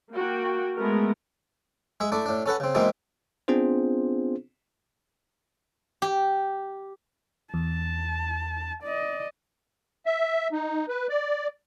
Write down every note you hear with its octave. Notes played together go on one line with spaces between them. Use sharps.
A#3 F#4 G5
G#3 A3 B3 A#4
G#3 G#4 E5
A3 D4 E4
A2 D4
C#4 A4 B4 F#5
C#3 C4
B2 E3 G#3 A#3 C4 D#4
B3 C4 D4 F4 G#4 C5
G4
E2 A5
D5 D#5
E5
D#4
B4
D5